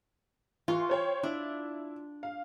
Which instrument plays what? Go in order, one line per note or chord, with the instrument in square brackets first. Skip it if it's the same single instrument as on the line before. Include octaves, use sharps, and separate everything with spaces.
[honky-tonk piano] E3 C6 C#6 [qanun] F4
[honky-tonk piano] C5 C#5 G5
[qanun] D4 [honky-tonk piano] E4
[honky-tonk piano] F5